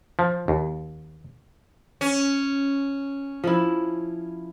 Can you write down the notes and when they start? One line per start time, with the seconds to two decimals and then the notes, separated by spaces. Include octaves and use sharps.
0.19 F3
0.48 D#2
2.01 C#4
3.44 F3 E4